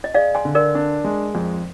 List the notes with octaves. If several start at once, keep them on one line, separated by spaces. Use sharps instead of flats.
D#5
G#4 D5 F5
G#5 C6
D3
A#4 D5
D4
G#3
F2